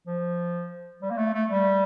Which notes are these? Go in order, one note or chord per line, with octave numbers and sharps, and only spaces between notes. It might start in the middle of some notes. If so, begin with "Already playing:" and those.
F3
G3
A#3
A3
A3
G3